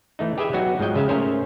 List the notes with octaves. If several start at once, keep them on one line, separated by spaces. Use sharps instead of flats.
E3 A3 D#4
G4 G#4 B4 D#5 E5 G#5
F#3 B3 D#4 F#4
G#2 F3 F#3 D#5 G5
G#2 C#3 E5 F5
A3 C#4 G#4 A#4 C5 C#5